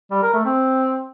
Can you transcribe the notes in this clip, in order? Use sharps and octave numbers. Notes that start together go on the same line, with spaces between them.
G3
A#4
A3
C4